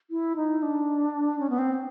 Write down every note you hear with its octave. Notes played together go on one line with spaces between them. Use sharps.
E4
D#4
D4
C#4
B3
C4